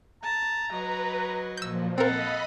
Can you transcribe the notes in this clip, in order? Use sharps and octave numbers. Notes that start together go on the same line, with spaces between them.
A5 A#5
F#3 B4 D#5
A#2 F3 E6 G6
C4 A4 A#4 D#5 F5 F#5 B5